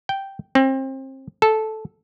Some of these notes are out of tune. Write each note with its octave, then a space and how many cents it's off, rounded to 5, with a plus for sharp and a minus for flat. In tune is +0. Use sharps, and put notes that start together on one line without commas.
G5 -5
C4 +30
A4 -10